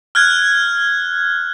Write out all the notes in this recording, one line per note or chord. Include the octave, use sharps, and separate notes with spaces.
F6 F#6 G#6